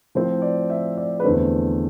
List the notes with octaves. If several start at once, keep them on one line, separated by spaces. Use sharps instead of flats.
A2 F3 C4 C5
D5
E5
D5
B4
E2 D3 A3 C4 C5